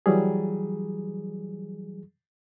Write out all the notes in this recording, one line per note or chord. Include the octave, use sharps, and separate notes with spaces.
E3 F#3 G3 G#4